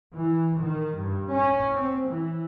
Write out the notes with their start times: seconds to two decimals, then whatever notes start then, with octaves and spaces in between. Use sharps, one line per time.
0.14 E3
0.62 D#3
0.99 G2
1.33 C#4
1.74 C4
2.08 E3